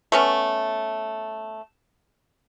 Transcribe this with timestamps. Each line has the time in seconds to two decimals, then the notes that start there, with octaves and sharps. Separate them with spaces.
0.12 A3 B3 C#4